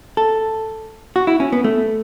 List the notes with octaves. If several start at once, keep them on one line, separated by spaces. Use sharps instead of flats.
A4
F#4
E4
C#4
B3
A3